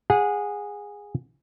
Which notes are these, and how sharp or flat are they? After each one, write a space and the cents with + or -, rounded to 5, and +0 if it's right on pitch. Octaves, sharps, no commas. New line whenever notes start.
G#4 -15 F#5 -25